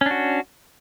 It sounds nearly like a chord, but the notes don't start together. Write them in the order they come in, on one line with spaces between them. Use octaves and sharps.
C#4 D4 F#4